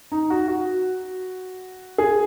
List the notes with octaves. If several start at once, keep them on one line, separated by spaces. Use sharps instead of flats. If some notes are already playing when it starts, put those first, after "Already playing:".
D#4
F#4
F#4
G#4